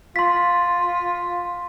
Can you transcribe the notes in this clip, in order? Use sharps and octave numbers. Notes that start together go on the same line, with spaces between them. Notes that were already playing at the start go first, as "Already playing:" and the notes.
F4 C6 B6